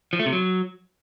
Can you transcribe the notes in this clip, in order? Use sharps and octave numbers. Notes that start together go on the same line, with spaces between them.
F3
A3
C3
F#3